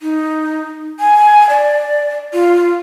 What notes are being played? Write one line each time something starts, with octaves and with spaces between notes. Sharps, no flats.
D#4
G#5
D5
F4